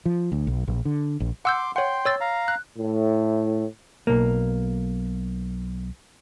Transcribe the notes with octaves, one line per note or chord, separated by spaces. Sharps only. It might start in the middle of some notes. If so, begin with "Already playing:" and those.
F3
D2
B1
A#1
D3
A#1
F#5 C6 D6 E6 G6
C#5 F#5 G5 C6
C#5 E6 A6
F5 A#5
F#6
A2
B1 A#3